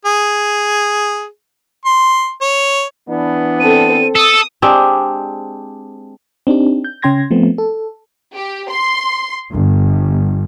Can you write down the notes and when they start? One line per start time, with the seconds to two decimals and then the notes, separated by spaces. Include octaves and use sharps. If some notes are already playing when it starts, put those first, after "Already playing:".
0.06 G#4
1.85 C6
2.42 C#5
3.08 E3 B3 D4
3.60 C4 A4 D#7
4.15 A4 D#6 E6
4.62 G#3 C4 D4 G4
6.47 C4 D4 D#4 G4
6.84 G6
7.02 C#3 C#4 G5 C6 G#6 A#6
7.31 F3 A3 B3 C4
7.58 A4
8.35 G4
8.69 C6
9.51 G1